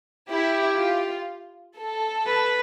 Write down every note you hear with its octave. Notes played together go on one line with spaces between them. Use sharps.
E4 G4
F4
A4
B4